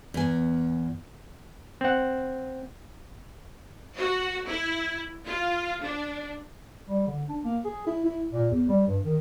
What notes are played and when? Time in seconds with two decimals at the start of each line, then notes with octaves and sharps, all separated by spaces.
0.14 E2 G#5
1.81 C4 F#5
3.97 F#4
4.45 E4
5.27 F4
5.82 D4
6.88 G3
7.07 D3
7.29 D4
7.45 A#3
7.65 G#4
7.86 E4
8.05 E4
8.32 A#2
8.51 E2
8.69 G3
8.87 G2
9.04 D#3